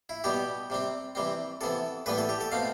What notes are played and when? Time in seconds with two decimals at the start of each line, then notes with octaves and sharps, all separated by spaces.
0.09 E4
0.24 B2 G3 B3 G4
0.70 C3 G3 C4
1.15 C3 E3 G3 C4
1.61 C3 E3 B3 A4
2.06 A2 E3 G3 B3 B4
2.18 A4
2.29 G4
2.41 A4
2.52 B2 A3 C4 F5